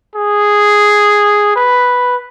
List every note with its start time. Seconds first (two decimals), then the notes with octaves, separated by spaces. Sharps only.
0.16 G#4
1.56 B4